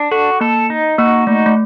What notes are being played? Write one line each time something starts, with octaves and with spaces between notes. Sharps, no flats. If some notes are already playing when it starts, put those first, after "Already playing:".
Already playing: D4
F#4 A4
A#3 A4
D#4
A#3 F#4
A3 D#4
A3